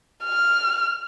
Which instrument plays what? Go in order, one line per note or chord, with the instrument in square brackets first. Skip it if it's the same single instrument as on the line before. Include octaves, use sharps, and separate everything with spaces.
[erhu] F6